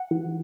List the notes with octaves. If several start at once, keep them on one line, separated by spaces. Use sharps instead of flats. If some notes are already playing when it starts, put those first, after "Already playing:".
Already playing: F#5
E3